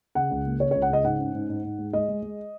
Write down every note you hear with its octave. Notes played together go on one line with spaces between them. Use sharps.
C#3 F#5
C#2
A#3
C#3 C#5
C#2 C#5
F#5
C#3 D#5
G#2 F#5
C#4
G#2
G#2
G#2
G#3
G#3 D#5
G#3
G#3